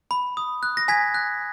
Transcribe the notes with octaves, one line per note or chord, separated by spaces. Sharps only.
B5
D#6
F#6
A#6
G#5 G#6 B6
F#6